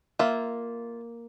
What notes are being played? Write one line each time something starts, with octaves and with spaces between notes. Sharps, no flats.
A#3 F4 E5